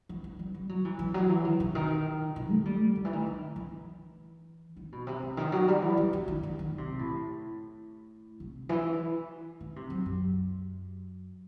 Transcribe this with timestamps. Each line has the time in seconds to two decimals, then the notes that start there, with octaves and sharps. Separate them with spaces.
0.09 E3
0.24 E3
0.39 G3
0.54 G3
0.69 F#3
0.85 E3
0.99 E3
1.14 F#3
1.29 E3
1.45 D#3
1.60 C3
1.75 D#3
2.36 C3
2.50 A3
2.65 G3
2.96 D#3
3.05 E3
3.13 D#3
3.26 D#3
3.56 E3
4.77 D#3
4.92 B2
5.07 C3
5.23 C3
5.37 D#3
5.52 F#3
5.68 G3
5.82 E3
5.97 D#3
6.13 D#3
6.28 D#3
6.43 D#3
6.59 D#3
6.78 C3
6.99 A2
8.40 C3
8.69 E3
9.60 D#3
9.76 C3
9.90 F#2
10.06 F#2